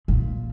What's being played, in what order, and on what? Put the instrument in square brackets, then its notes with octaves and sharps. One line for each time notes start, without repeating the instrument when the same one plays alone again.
[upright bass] A#2